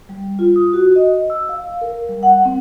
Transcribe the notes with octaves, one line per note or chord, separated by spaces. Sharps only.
G3
F4
D#6
F#4
D#5
E6
F5
A#4
G3
F#5
C4